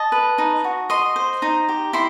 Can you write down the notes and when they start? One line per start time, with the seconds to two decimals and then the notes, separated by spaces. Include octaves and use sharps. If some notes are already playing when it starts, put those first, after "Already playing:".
Already playing: D#5 A5
0.12 B4
0.38 D#4
0.64 F#4
0.90 D#5 C6
1.16 C5
1.42 D#4
1.69 G4
1.93 E4 C6